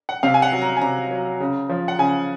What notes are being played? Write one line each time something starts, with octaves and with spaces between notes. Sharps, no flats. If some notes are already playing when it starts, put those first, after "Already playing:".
F#5
C3 F5
G#5
F#5
F#3
A#5
G#5
C3 A#5
F#3
C#3
F3
F#5
C#3 G#5